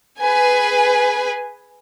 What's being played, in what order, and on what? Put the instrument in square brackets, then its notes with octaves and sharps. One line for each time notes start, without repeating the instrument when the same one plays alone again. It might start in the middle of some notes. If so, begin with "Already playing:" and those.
[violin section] G#4 B4 G#5